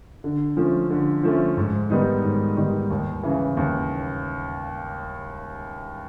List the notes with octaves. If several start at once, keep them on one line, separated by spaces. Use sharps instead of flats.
D3
F3 A3 C#4
D3
F3 A3 C#4
G#2
D#3 G3 B3 D#4
G#2
D#3 G3 B3 D#4
D#2
C#3 E3
D#2